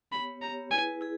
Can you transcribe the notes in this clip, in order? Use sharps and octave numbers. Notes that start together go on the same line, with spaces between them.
B3 G4 C#5 B5
B3 G4 C#5 A#5
E4 G#4 B4 G#5
E4 G#4